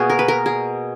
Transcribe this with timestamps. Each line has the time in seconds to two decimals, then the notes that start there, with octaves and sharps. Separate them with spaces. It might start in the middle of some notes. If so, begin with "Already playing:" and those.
Already playing: B2 A#3 F#4 G#4
0.10 A#4
0.19 B4
0.28 A#4
0.46 G#4